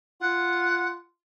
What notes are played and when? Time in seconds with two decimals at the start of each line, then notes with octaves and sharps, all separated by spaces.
0.21 F4 F#5